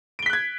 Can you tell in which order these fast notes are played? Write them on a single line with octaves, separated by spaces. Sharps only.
D7 G7 B6 F#6 G#6